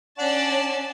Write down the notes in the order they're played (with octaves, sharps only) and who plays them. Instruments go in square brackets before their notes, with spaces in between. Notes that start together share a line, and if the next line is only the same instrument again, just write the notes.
[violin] C#4 A5 [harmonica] D4 D5 F#5